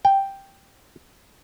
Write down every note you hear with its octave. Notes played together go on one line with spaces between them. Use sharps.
G5